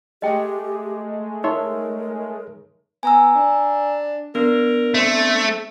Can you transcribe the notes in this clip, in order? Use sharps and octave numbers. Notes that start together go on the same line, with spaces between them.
G#3 A3 G4 D#5 G5
D#4 A#4 C#5 E5 C6
B3 G#5 A#5 E6
D4
B3 D4 A#4
A3 C4